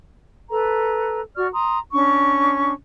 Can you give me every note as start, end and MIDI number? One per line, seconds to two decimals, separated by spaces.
0.50 1.21 69
0.50 1.21 71
0.50 1.21 82
1.36 1.47 66
1.36 1.47 74
1.36 1.47 85
1.36 1.47 89
1.52 1.79 82
1.52 1.79 84
1.52 1.79 87
1.92 2.72 61
1.92 2.72 62
1.92 2.72 85